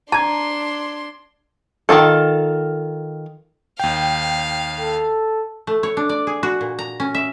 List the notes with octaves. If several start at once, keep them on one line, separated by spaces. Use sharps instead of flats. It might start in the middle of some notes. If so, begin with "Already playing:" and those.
D4 A5 A#5 C6 G#6
D#3 F3 F4 A4
D#2 F5 G5
A4
A3
C#5
D4
D5
G#4
F#4
A#2
A#5
C#4
E5